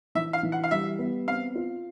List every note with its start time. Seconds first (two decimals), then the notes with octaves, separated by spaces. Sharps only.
0.15 E3 E5
0.33 F5
0.43 E3
0.52 F#5
0.64 F5
0.71 G3 E5
0.99 B3
1.27 C4 F5
1.55 F4